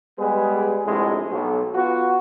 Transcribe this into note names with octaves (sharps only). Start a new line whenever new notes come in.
G3 G#3 B3 G#4 B4
A#1 A2 C3 G#3
B1
B3 F4 F#4